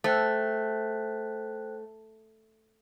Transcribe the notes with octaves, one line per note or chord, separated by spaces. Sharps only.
A3 C5 G5 F#6